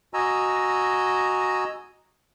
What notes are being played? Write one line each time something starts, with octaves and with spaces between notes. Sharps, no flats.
F#4 D#5 G#5 A#5 E6